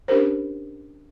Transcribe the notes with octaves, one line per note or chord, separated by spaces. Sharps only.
C#4 D4 G4 A#4 C5